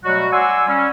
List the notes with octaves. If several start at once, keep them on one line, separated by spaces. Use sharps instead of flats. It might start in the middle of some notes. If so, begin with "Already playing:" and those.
B2 F#3 G3 A3 F#4
D5 F#5 G#5 C6 E6
G3 C#4